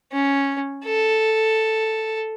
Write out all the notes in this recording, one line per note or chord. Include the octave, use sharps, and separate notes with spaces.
C#4
A4